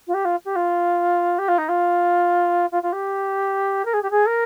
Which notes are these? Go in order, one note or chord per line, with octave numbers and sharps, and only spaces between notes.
F4
G4
F4
G4
F4
G4
F4
D#4
F4
F4
F4
G4
A#4
G#4
G4
G#4
A#4